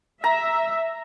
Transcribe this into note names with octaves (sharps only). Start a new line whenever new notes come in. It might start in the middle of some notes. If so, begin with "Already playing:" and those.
E5 A#5